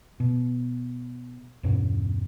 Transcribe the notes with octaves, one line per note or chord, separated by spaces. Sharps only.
B2
E2 G2 B2 C#4